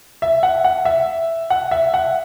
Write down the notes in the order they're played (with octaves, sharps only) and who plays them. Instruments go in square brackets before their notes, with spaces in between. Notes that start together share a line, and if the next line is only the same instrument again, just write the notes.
[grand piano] E5
F#5
F#5
E5
F#5
E5
F#5